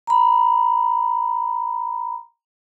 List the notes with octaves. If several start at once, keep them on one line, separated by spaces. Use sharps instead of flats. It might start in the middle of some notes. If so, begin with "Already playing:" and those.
A#5 B5